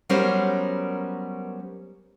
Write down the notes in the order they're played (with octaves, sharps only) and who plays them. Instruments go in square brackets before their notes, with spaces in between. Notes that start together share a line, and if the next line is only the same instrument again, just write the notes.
[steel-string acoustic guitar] F#3 G3 B3 C#4 A#4 C5